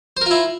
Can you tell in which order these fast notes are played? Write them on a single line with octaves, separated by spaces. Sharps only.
C5 A#4 F4 E4